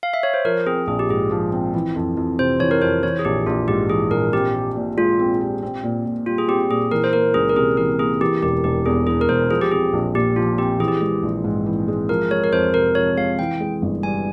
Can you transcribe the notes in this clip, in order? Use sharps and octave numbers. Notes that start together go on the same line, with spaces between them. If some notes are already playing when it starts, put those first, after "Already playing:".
F5
E5
C#5
C5
F3 A#4
C4 G#4
A#1 G#4
G4
G#2 G#4
F3
C4
E3
F2
F2
C3 C5
E3 C#5
A#4
F2 C5
E3 C#5
G#4
A#1 G4
A#1 F4
G#2 G4
E3 G#4
A#1 A#4
C4 G4
G4
A#2
G#3 F4
C4
G4
C4
A#2
A#2
G3 F4
G#4
C4 G4
A#2 G#4
E3 A#4
C5
A#3 A#4
C#2 G#4
A#4
C3 G#4
E3 A#4
A#3 G#4
E3 G4
E1 G4
E1 G4
E2 G#4
E3 G#4
A#4
E1 C5
F3 G#4
G4
C4 G#4
A#1
A#2 G4
F3 F4
C4 G4
E3 G#4
G4
G#3 G#4
A#1
G#2
E3
G#3
F3 A#4
G#3 C#5
A#4
F2 C5
C3 A#4
F3 C#5
G#3 F5
E3 G5
G#3
G1
G2 G#5